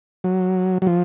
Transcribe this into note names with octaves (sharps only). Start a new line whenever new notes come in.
F#3
F#3
F3